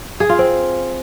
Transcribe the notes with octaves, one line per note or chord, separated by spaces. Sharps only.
G#4
F4
C4